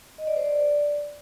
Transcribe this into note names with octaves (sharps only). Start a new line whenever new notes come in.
D#5
D5
C5
D5